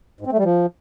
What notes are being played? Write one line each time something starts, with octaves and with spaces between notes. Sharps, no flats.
G#2
C4
A3
G3
F3